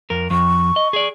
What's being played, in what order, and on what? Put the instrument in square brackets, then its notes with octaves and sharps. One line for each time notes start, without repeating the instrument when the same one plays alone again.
[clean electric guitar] F2 A#4
[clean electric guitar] F2 [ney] C#6
[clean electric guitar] D#5
G#4 D5